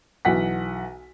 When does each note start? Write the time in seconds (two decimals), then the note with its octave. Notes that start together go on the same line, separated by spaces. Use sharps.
0.25 B1 E3 F#5 B6